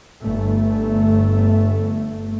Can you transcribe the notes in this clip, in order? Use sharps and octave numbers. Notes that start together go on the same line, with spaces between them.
G1 A3